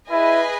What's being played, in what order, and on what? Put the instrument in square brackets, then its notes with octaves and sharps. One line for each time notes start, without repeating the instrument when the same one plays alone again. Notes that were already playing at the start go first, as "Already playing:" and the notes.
[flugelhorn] E4 [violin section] G#4 B4 D#5 G#5